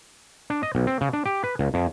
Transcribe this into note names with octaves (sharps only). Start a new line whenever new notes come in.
D4
D#5
B1
C4
C#3
D4
G4
B4
C#2
F2